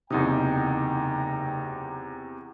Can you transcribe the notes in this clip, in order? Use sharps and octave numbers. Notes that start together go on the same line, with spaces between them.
F#1 E2 C3 D#4 G5 A#5 D#6